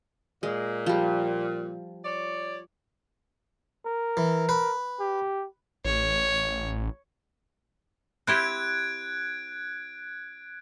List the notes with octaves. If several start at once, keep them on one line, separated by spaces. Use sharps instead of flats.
A#2 G#3
F3 G3
C#5 D5
A#4
E3
B4
G4
A1 C#5
C4 E4 G4 F#6 G#6 D7